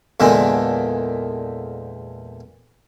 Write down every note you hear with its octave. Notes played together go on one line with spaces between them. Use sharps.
E2 A#2 D3 G#3